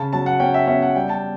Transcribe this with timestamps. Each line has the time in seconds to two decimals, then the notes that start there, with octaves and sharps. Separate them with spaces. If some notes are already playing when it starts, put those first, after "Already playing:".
Already playing: C#3 A5
0.13 F#3 A5
0.26 F#5
0.40 C#4 G5
0.54 E5
0.67 C#4 E5
0.82 F#5
0.95 G3 G5
1.09 A5